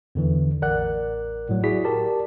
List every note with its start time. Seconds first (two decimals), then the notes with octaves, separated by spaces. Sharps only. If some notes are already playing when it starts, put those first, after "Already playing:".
0.15 E2 D3 E3
0.62 A1 A#4 D5 F#5 F#6
1.49 A2 F#3
1.63 E4 F#4 G#4 D5 B6
1.84 G4 A#4 D5 A5